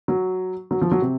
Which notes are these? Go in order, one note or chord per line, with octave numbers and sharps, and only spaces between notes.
F#3
F#3
F3
F#3
C3